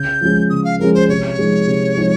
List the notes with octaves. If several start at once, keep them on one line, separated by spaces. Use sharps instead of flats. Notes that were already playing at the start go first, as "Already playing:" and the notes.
Already playing: C#3 G6
F3 G#3 C#4 G#4
C#3 D#6
F5
F3 G#3 C#4 G#4 A#4
C5
C3 C#5
F3 G#3 D#4 G#4
C3
F3 G#3 D#4 G#4